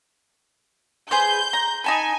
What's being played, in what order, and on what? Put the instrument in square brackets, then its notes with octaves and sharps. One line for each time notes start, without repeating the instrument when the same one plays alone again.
[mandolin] G#4 B4 C5 [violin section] G6
[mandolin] A#5
[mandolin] D#4 A5 B5 [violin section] G#5